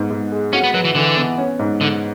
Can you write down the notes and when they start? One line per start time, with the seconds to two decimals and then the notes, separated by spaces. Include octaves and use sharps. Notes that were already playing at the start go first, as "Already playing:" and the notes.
Already playing: G#2 B3
0.10 G#2
0.32 G#3
0.53 C#4 F#4
0.64 B3
0.74 F#3 B4
0.85 E3
0.95 D3 E3
1.17 B3
1.38 C#4
1.59 G#2
1.81 G#2 D3